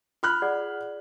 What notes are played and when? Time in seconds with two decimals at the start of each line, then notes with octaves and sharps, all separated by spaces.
0.23 F4 B5 F6 F#6
0.42 G#4 D5 F#5